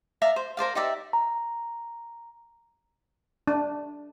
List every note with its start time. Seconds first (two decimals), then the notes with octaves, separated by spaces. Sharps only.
0.22 D5 E5 F5 A#5
0.36 C5
0.57 A#4 C5 D5 F5
0.75 D#4 G4 D5 E5
1.13 A#5
3.47 D4